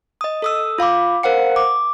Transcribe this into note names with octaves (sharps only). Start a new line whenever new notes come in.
D#5 D#6
A4 D#6 E6
F4 F5 B5 D6
A#4 C5 F5 F#5 C#7
D6